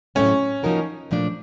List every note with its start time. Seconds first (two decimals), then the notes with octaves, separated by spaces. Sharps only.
0.15 A2 F#3 A3 C4 C#4
0.63 F3 A#3 D#4 F#4 A#4
1.11 A#2 F3 A3 D4